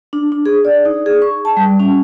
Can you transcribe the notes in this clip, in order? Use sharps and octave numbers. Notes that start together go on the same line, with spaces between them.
D4
D4
G#4
D5
D#4
G#4
C#6
A5
G3
C#4